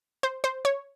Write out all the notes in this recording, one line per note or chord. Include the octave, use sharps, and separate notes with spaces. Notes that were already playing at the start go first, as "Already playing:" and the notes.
C5
C5
C#5